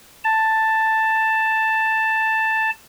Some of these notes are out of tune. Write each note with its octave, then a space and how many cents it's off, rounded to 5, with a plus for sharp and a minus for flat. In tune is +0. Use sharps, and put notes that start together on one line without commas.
A5 +5